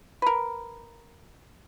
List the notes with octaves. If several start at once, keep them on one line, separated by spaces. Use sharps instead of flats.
A#4 B4